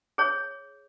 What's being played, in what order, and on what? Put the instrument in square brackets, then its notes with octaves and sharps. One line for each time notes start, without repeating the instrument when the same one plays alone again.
[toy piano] G#4 C#5